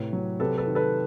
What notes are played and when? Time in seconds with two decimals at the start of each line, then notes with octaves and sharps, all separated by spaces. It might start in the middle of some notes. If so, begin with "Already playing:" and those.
Already playing: A2 C3 B4 C#5
0.13 F#3
0.40 C3 A4 B4
0.58 A4 B4
0.67 D#3
0.75 A4 B4